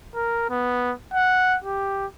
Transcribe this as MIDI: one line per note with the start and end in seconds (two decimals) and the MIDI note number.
0.15 0.46 70
0.50 0.92 59
1.14 1.57 78
1.64 2.06 67